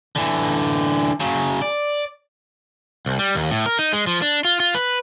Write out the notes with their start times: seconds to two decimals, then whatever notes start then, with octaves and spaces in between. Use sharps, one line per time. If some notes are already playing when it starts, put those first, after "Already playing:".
0.16 D3 E3
1.20 C#3 F#3
1.62 D5
3.06 C2
3.19 G3
3.35 D#2
3.51 A2
3.66 A#4
3.79 D#4
3.93 G#3
4.07 F3
4.22 D4
4.45 F4
4.60 F4
4.75 B4